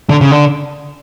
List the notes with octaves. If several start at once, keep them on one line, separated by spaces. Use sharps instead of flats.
D3
C#3
D3